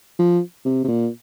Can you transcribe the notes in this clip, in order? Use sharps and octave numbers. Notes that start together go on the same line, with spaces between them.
F3
C3
C3
A#2